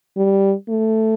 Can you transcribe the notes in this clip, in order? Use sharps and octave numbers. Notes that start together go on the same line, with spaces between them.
G3
A3